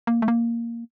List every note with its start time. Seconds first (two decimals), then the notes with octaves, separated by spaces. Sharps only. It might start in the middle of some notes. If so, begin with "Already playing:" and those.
0.07 A#3
0.22 A3
0.28 A#3